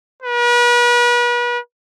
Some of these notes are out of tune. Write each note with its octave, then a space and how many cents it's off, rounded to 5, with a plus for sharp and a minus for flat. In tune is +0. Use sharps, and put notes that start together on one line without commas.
B4 -40